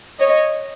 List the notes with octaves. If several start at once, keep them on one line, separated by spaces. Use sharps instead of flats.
C#5 D#5